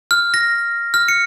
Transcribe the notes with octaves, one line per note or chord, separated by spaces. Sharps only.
F6
A#6
F6
C#7